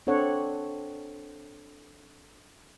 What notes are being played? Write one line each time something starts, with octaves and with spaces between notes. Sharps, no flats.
C4 D4 A4 C#5 F#5